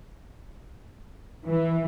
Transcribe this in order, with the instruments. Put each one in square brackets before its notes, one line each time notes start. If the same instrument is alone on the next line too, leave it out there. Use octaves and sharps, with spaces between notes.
[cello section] E3